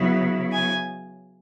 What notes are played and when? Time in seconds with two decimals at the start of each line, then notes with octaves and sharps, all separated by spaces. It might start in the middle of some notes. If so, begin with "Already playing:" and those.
Already playing: C#3 F#3 B3 E4
0.52 G#5